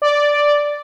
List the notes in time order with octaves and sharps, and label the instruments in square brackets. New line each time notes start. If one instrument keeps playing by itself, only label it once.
[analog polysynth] D5